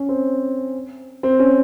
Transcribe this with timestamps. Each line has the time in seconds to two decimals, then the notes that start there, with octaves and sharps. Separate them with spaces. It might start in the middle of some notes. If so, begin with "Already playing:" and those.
Already playing: C#4
0.09 C4
1.23 C4
1.39 C#4